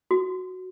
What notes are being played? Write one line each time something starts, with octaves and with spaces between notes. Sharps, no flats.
F#4